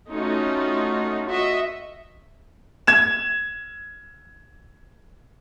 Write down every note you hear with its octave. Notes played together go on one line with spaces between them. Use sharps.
A3 C#4 D#4 F4 F#4
F#4 D#5 E5
G#6 E7